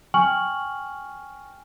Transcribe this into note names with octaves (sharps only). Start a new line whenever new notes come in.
G5 G#5 C#6 F6 F#7